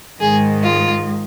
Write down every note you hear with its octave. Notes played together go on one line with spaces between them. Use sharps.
G#2 D#3 G#3 G#4
F4